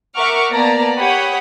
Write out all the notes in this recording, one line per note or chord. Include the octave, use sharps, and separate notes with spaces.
A#4 E5 F#5 C#6 D6 F6
A#3 B3 D5 A5 A#5
G4 C#5 F#5 B5 D#6